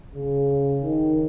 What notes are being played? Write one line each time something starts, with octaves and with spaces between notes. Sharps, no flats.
C#3
D#3